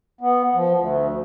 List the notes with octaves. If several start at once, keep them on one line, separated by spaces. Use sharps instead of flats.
B3
F3
D2